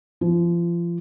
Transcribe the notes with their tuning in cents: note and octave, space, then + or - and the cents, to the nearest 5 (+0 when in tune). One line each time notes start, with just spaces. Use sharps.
F3 -30